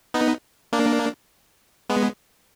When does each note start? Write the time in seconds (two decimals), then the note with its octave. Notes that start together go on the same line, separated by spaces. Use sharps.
0.14 B3 D#4
0.73 A#3 D4
1.89 G#3 B3